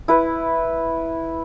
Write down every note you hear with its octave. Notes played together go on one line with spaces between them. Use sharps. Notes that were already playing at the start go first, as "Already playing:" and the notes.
E4 B4